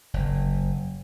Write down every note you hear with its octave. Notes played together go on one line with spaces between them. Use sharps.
F#1